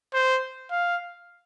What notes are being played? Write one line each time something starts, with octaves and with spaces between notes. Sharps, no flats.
C5
F5